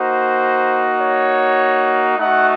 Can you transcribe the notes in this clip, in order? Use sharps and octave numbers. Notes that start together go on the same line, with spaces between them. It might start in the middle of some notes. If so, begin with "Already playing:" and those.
Already playing: A#3 D#4 F#4 C5
C#5
A3 D#4 F#4 F#5